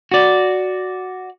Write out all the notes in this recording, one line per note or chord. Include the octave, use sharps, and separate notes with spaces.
F#4 D5